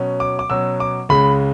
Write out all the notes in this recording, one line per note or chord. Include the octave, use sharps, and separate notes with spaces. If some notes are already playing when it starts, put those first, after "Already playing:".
Already playing: B2 F#3 C#4
D6
D6
B2 F#3 C#4 E6
D6
C#2 C#3 G#3 B5